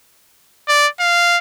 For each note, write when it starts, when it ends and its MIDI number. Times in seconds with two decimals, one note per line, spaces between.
0.68 0.88 74
1.00 1.38 77